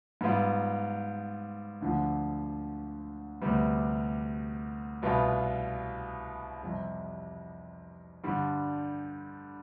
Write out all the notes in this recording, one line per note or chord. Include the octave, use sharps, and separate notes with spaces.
G#2 G3 B3 F4
D2 D3 F3
D2 C3 G3 B3
C2 B2 B3 F4
F2 C3 G3
G2 D3 G3